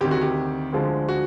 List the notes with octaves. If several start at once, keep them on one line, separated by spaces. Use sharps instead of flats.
D2 C3 D#3 G4
F#4
G4
D2 D3 F3 G#3
F#4